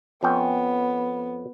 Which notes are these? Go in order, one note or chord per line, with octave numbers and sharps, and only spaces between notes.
F2 B3 C#4 G5